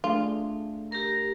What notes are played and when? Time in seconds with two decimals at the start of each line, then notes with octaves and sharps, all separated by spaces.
0.04 A3 D4 F4 G#4
0.92 G4 A#4 A#5